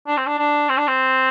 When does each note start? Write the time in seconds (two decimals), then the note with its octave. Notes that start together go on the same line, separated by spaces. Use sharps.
0.07 D4
0.17 C4
0.26 D4
0.38 D4
0.69 C4
0.78 D4
0.88 C4